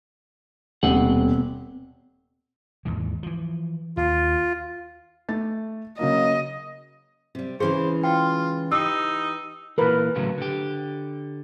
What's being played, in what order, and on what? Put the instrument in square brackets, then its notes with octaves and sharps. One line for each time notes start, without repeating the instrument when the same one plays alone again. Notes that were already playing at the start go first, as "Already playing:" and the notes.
[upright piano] D#1 [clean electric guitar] B2 C4 F#5
[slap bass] D#2 G#2 E3
E3 F3
[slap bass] D#2 [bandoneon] F4
[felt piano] A3 A6
[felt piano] C#3 F#3 A#3 [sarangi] D#5
[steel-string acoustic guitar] C3 G3
[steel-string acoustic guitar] C#3 E3 G#3 [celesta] G#4 [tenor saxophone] C5
[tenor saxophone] F4 [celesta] G5
[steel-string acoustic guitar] E3 G4 [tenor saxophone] D#4 [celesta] E6
[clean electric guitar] A#2 E3 [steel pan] A#4 B4
[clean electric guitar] A2 C#3 F#3
D3 G4